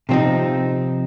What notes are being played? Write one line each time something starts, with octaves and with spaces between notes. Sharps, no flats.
C3 F3 C4 D#4